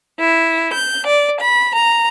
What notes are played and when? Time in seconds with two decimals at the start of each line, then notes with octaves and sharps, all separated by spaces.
0.20 E4
0.73 G6
1.07 D5
1.39 B5
1.74 A#5